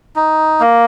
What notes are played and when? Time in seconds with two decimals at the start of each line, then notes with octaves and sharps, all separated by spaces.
0.16 D#4
0.60 A#3